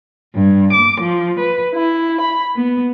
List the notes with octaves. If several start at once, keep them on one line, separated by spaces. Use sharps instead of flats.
G2
D6
F3
B4
E4
B5
B3